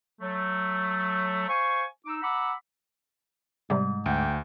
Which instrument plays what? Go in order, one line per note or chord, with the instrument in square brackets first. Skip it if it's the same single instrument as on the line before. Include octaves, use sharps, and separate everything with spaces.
[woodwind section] F#3 A3
C5 F5 G#5 C#6
D#4 D6 E6
F#5 A#5 B5 D6 E6
[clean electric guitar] G#2 [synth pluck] C3 G3
[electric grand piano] D2 [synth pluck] F#5 [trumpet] G5